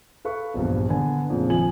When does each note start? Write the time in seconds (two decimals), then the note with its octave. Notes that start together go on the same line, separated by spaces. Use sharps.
0.25 A4 B4 F5 C#6
0.54 A#1 E2 G2
0.89 D3 B3 G#5
1.30 F2 A#2 C#3
1.49 G#1 F2 F3 G#5 F#7